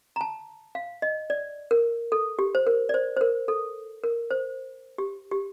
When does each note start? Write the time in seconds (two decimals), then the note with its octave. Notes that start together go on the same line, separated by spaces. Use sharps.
0.16 A#5
0.21 A5
0.75 F5
1.02 D#5
1.30 D5
1.71 A#4
2.12 A4
2.39 G4
2.55 C5
2.67 A#4
2.89 D5
2.94 C5
3.17 C5
3.21 A#4
3.48 A4
4.04 A#4
4.31 C5
4.98 G4
5.31 G4